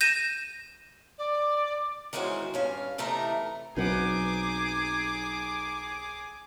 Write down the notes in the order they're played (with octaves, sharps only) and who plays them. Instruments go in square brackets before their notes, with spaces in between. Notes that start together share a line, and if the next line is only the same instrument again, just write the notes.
[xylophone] G6 A#6 D#7 E7
[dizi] D5
[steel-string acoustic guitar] D#3 E3 G#3 C#4 F#4 C5
G2 C#4 F5
C3 E3 A3 D#4 A#4 A#5
[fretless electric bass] B1 F#3 C4 [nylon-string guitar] D#4 B4 F#5 [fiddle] G#4 D6